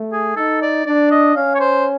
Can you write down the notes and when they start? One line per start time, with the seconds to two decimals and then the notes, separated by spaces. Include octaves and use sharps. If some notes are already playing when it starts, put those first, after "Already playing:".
Already playing: A3
0.12 G#4
0.36 D#4 A4
0.62 D5
0.86 D4 D5
1.11 D#5
1.35 C#4 F5
1.55 C#5
1.60 C5